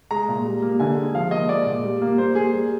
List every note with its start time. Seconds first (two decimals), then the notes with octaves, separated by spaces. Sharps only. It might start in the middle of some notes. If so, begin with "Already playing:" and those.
0.11 G#3 A#5
0.28 A#2
0.45 G3
0.62 A#3
0.80 D3 G#5
0.97 G#3
1.15 F3 F5
1.31 A#3 D#5
1.49 G#3 D5
1.66 A#2
1.84 G3
2.02 A#3
2.18 G3 C5
2.35 A#3 G#4
2.53 G3